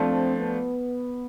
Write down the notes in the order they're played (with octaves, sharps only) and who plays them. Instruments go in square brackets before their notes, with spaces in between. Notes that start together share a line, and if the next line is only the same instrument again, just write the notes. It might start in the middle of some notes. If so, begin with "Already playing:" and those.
Already playing: [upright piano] F3 A3 D4 F4 [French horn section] C4
[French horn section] B3